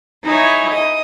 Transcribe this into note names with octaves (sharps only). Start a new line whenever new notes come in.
D#4 E4 G#4 C#5
D#5 D#6